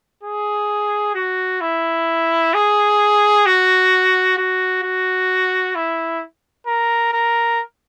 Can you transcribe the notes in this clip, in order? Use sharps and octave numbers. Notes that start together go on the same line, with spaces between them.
G#4
F#4
E4
G#4
F#4
F#4
F#4
E4
A#4
A#4